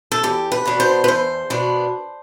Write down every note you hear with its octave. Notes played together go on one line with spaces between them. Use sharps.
A4
E2 G4
B4
B2 B3 D4
C5
B4
E2 C5
B2 B3 D4